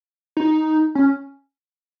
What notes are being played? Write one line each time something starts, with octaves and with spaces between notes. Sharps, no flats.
D#4
C#4